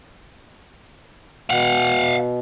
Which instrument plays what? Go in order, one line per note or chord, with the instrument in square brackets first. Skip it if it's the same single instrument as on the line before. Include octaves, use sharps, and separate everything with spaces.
[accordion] B2 [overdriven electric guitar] F5 F#5